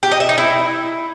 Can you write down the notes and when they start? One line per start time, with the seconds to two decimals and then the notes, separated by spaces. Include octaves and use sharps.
0.03 G4
0.11 D#5
0.20 E5
0.29 D#4
0.38 E4